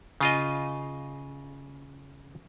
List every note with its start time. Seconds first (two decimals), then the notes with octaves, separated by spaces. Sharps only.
0.21 C#3 F4 D#5